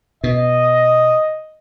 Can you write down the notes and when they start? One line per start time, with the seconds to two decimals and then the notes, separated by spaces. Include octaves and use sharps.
0.24 B2 D#5